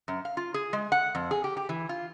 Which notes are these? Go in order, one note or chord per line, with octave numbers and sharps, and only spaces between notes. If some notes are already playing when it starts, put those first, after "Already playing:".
F#2
F5
F4
G#4
G#3
F#5
F2
G#4
G4
G4
E3
F4